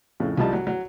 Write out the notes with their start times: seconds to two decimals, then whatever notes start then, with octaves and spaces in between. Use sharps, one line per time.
0.20 F2 A2 C#3
0.37 C2 F3 G3 D#5 A5
0.53 F#3
0.67 F#3